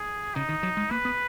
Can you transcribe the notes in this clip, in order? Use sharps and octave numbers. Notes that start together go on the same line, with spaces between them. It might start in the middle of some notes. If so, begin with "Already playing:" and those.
Already playing: G#4
C#3 D#4
D#3
F#3
G#3
A#3 B4
B3